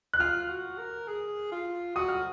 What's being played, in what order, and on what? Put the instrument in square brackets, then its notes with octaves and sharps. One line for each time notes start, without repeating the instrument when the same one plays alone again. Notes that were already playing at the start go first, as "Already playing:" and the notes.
[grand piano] F#6
[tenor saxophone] F4 [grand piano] F6
[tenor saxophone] F#4
A#4
G#4
F4
[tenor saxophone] F#4 [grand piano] D#6
[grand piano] F6